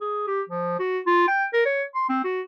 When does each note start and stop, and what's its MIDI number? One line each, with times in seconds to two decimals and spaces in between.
0.01 0.26 68
0.28 0.42 67
0.49 0.78 53
0.79 0.99 66
1.06 1.27 65
1.28 1.45 79
1.53 1.63 70
1.66 1.84 73
1.95 2.08 84
2.09 2.20 60
2.24 2.42 66